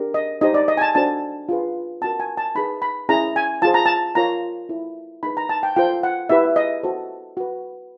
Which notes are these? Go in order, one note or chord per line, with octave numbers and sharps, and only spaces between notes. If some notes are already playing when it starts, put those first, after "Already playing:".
Already playing: D4 G4 A#4
D#5
D#4 G4 C5 D#5
D5
D#5
G#5
A5
D4 F#4 A4 C5 A5
F4 G#4 B4
C#4 F#4 A#4 A5
G#5
A5
D#4 G#4 B4 B5
B5
C#4 E4 G#4 A#5
G#5
F4 G#4 C5 A5
A#5
A5
F4 A#4 C#5 A#5
E4 A4 C#5
D#4 G#4 B4 B5
A#5
A5
G5
F4 A4 C5 G5
F#5
E4 G4 B4 E5
D#5
F#4 A4 C5
F#4 B4